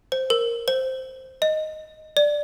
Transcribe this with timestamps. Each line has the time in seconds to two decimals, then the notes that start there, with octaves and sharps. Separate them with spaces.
0.12 C5
0.30 A#4
0.68 C5
1.42 D#5
2.17 D5